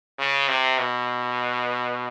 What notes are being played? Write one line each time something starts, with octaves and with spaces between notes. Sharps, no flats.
C#3
C3
B2